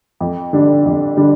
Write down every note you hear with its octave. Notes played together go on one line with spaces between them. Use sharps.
F2
D3 G3 D4
F2
D3 G3 D4